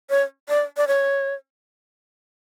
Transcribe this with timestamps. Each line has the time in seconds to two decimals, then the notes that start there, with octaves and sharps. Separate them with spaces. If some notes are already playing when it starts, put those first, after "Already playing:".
0.10 C#5
0.49 D5
0.77 D5
0.87 C#5